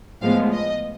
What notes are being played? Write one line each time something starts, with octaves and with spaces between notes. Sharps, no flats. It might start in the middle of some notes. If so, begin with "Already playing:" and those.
A2 F3 G#3 B3 F5
D#5